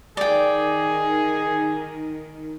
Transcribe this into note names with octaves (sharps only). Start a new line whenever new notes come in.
D#3 G#4 D5 G5